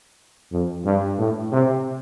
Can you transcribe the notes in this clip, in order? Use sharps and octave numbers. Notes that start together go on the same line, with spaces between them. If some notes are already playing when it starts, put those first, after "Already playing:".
F2
G2
A2
C3